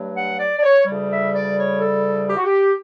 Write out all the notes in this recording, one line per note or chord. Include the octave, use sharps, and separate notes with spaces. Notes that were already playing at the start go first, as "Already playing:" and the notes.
Already playing: G2 F#3 A3
F#5
D5
D5
C#5
D2 C#3 G3
E5
D5
C#5
A4
G4
F#4
G4